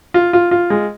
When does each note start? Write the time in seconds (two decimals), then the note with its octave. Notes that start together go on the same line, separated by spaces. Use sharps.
0.14 F4
0.33 F4
0.51 F4
0.70 G#3